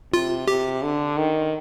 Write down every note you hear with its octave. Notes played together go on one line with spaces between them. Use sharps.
C3 F4
C3 G4
D3
D#3